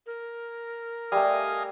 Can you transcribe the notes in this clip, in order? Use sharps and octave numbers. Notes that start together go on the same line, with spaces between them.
A#4
G3 A3 D#5 F5 G#5